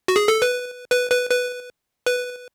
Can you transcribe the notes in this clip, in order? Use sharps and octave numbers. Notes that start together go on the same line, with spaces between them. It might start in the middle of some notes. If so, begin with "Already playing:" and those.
F#4
G#4
A4
B4
B4
B4
B4
B4